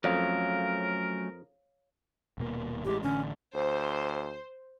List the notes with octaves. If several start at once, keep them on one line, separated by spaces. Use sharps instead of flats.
F2 F#3 A3 C#4 A#4 C#5 F5
D#1 B2 A#3
A1 E3 G#3 G4
A1 D3 C#4
D2 C5